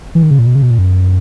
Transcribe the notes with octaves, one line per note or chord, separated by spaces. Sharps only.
E3
D#3
C#3
A#2
B2
C#3
B2
A#2
F#2